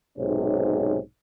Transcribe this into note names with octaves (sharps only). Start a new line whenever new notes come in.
B1 G#2 C3 C#4